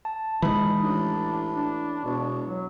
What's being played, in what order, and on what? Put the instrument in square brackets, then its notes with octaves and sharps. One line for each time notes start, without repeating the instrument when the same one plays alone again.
[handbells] A5
[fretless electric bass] E3 G#3 [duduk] D#4 [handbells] B5
[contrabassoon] A1 [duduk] D4
[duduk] D4
[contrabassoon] E1 [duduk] B2
[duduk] F#3